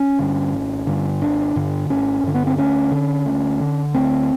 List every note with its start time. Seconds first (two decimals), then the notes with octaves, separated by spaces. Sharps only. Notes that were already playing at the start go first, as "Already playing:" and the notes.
Already playing: C#4
0.19 G2 D3
0.53 G#1
0.87 G2 D3
1.21 G#1 D4
1.56 G2 D3
1.90 G#1 C#4
2.24 G2 D3
2.35 B3
2.47 C4
2.57 D2 C#4
2.91 D3
3.26 D2
3.60 D3
3.94 D2 C4